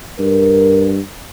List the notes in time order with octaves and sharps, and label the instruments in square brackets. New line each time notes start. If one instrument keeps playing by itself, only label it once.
[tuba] G2 [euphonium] A#4